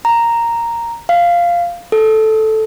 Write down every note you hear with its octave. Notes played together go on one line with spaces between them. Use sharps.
A#5
F5
A4